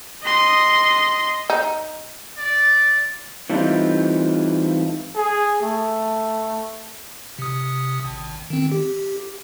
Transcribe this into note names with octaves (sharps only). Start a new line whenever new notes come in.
D#5 C6
D#4
D5
E3 G3 A3 C4 D#4 F4
G#4
A3
C3 D#6
G#1
D#3 C4
G4